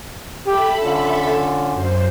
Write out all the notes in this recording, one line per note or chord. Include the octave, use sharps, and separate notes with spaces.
G4 A4 E5 B5
D3 C#4 F4
F#2 C5